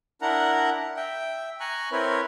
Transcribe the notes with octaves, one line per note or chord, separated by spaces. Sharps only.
D4 E4 A#4 F#5 A#5
E5 G5
G#5 A#5 C#6 F#6
C4 E4 A#4 B4 C#5